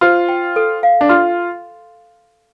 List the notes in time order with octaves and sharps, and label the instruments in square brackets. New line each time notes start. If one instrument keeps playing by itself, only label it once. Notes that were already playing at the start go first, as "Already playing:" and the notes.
[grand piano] F4 [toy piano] C5
[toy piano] G5
A4
F5
[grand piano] D4
[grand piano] F4 [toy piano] C6